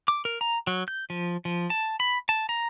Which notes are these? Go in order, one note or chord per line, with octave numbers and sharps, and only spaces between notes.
D6
A#4
A#5
F#3
G6
F3
F3
A5
B5
A5
A#5